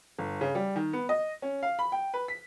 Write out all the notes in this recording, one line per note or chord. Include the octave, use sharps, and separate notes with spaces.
G1
C#3
G3
D#3
B3
D#5
C#4
F5
B5
G5
B4
B6